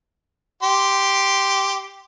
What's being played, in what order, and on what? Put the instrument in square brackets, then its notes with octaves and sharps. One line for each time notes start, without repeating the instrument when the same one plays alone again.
[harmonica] G4 C6